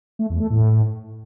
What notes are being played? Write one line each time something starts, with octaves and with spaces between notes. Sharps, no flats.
A3
E2
A3
A2